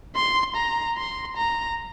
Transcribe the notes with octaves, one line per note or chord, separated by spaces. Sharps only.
C6
A#5
C6
A#5